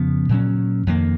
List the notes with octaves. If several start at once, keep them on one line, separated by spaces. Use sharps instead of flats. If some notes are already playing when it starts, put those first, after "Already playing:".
Already playing: F2 C#3 F3 B3
A#2 F#3 C#4
F2 D#3 A#3